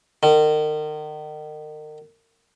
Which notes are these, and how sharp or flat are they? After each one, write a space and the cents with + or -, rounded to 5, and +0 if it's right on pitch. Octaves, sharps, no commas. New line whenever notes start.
D#3 -35